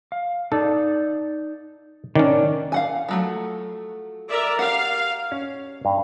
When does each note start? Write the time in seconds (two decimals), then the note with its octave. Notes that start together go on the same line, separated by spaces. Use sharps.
0.12 F5
0.52 D#4 A4 D5
2.16 D#3 C#4 D4 C#5 D5
2.72 F5 F#5 G#5
3.09 F3 F#3 A3
4.28 A#4 D5 E5
4.59 G4 F5 F#5
5.32 C#4
5.85 G2